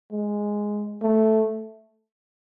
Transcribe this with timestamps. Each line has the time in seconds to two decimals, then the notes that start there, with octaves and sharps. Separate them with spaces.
0.12 G#3
1.02 A3